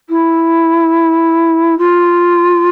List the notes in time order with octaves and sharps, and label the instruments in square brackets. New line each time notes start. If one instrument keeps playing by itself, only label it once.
[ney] E4
F4